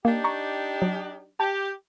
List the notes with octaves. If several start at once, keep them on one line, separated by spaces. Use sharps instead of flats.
A#3 D4 D#4 G4
A#5 C#6
F#3
G4 A5